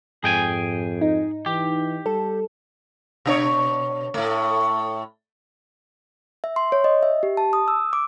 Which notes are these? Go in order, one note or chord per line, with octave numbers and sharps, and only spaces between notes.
F2 G#2 G#4 G5 G#5
D#4
E3 G4
G3 A4
B2 D4 C#5
A2 A3
E5
C6
C#5
D#5
E5
G4
A5
D#6
E6
D6